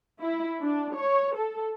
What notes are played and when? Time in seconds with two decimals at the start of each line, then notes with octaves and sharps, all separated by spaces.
0.21 E4
0.63 D4
0.96 C#5
1.37 A4